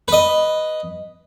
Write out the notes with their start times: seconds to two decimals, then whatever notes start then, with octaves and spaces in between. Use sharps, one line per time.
0.08 B4 D#5